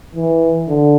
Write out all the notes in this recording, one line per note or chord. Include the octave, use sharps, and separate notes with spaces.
E3
D3